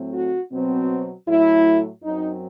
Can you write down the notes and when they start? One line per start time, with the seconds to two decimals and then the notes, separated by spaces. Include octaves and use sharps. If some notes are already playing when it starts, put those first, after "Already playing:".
Already playing: A2 F#3 A3 C4
0.13 F#4
0.51 B2 F#3 C4
1.28 A2 F#3 A3 E4
2.03 F#2 F#3 C4 D#4